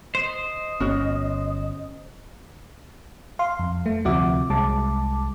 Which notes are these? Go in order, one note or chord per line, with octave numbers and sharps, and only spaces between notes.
C5 D#5
G1 C#4 F#4
F5 C6
F2
A3
D2 C3 F3 F#4 E5 D6
C2 G#3 A5 D6